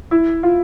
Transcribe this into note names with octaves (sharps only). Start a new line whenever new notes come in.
E4
F4